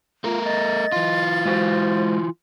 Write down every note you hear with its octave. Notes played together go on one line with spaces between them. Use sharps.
A3 F4 A#4
D#5 A6
E3 F4
G#3 F#4 C5